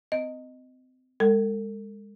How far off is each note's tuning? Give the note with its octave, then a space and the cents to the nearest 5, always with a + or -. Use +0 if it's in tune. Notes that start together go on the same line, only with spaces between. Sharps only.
C4 -35 D#5 +0
G#3 -25 A4 +45 G5 -40